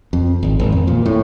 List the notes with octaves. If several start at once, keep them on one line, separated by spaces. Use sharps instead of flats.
F2
G#1
G#1
F2
A#2
A2